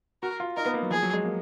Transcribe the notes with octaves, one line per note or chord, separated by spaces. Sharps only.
F#4 A#4
F4
D#4 A#4
B3
A#3
F#3
F3 G#4
F#3
G#3
A#3